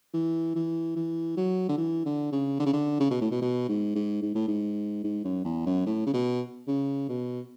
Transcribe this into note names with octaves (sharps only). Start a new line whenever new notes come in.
E3
E3
E3
F#3
D3
E3
D3
C#3
D3
C#3
D3
C#3
B2
A2
B2
B2
G#2
G#2
G#2
A2
G#2
G#2
F#2
E2
F#2
A2
C#3
B2
C#3
B2